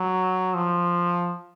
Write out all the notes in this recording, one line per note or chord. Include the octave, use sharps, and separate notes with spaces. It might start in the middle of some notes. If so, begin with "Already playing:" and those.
Already playing: F#3
F3